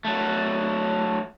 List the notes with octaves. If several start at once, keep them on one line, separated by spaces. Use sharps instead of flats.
F#3 A3